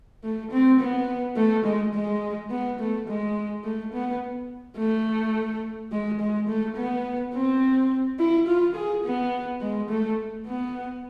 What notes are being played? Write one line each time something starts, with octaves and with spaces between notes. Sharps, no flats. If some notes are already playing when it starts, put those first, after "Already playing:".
A3
C4
B3
A3
G#3
G#3
B3
A3
G#3
A3
B3
A3
G#3
G#3
A3
B3
C4
E4
F4
G#4
B3
G#3
A3
B3